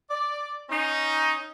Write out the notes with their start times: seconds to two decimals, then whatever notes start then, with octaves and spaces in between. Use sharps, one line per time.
0.10 D5
0.70 C#4 D#4